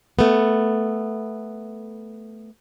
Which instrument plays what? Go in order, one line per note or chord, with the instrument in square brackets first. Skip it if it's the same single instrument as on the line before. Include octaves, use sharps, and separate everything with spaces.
[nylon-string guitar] A3 B3